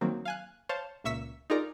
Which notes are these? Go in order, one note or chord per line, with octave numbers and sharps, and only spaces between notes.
D#3 F#3 A#3 C4
F5 G#5 F#6
C5 C#5 F5 A5
C#2 A#2 E5 C#6 E6 B6
D#4 F4 G#4 A#4 D5 A#5